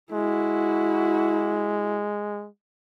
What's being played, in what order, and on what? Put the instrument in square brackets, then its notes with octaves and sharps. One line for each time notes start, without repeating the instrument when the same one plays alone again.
[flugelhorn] G#3 [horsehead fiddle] E4 F#4